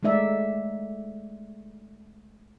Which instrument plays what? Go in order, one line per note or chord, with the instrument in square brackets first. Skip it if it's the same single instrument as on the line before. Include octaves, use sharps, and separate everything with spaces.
[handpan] G#3 A3 D#4 D5 E5